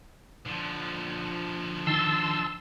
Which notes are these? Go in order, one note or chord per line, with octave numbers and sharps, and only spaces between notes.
D3 F3
D#3 A5 C6 E6